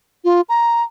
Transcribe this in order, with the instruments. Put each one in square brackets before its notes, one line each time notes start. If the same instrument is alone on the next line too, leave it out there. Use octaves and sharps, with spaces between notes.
[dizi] F4
A#5